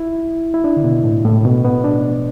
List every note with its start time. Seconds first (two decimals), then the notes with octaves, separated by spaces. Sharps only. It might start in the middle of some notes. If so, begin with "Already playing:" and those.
Already playing: E4
0.54 E4
0.64 D4
0.77 D3
0.84 B2
1.04 A2
1.25 A2
1.45 B2
1.65 B3
1.84 D4